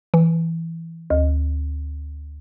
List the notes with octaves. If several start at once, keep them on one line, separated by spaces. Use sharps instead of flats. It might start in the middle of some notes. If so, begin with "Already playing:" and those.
E3
D2